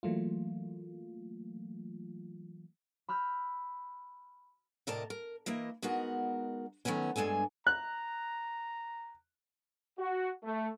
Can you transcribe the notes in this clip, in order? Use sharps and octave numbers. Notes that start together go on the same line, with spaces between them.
E3 F#3 A3 A#3 F4
B5 E6 F6 G6
A2 C3 A#4 D5 D#5 A5
A#4
E3 A#3 E4 D#5
G#3 B3 D#4 F#4 A#4 F#5
D#3 F#3 A3 B3 C#4
G2 G#3 D4 A4 G#5
A#5 F#6
F#4
A3